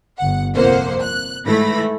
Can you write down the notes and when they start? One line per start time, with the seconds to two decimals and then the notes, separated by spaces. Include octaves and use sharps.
0.18 G1 F#5
0.55 C2 F2 A#3 C5 F#5
1.02 F#6
1.46 G#2 E3 A3 E4 B5 A#6